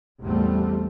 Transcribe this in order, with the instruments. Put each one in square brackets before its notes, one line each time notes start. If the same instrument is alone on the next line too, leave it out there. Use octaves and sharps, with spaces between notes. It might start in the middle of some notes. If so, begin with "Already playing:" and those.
[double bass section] A1 E2 G3 A3 C4